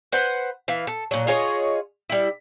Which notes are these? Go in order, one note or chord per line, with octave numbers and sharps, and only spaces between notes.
B4 C5 F#5
E3 F5
A4
A#2 F#3
F4 G#4 C#5 D#5
G3 E4